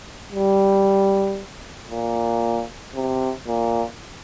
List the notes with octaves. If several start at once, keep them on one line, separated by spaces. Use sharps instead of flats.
G3
A#2
C3
A#2